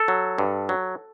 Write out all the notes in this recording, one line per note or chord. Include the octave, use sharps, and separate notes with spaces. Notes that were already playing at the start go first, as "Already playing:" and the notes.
Already playing: A4
F#3
G2
F#3